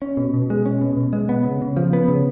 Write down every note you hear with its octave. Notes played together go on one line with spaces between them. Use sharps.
C#4
B2
B2
G#3
C#4
B2
B2
G#3
B3
C#3
C#3
F3
B3
C#3